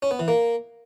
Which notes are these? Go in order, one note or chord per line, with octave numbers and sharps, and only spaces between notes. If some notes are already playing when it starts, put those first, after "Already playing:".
C#4
B3
E3
A#3